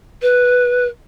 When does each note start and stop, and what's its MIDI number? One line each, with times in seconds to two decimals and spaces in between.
0.22 0.87 71